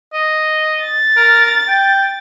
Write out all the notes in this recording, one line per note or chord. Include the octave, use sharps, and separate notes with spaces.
D#5
A6
A#4
G5